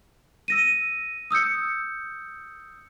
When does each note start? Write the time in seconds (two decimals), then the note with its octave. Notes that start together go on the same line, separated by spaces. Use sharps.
0.48 E6 A#6 D#7
1.31 D#6 E6 G6 C#7